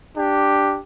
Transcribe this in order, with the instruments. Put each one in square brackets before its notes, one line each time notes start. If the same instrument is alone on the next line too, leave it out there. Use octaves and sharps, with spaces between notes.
[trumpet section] D4 G4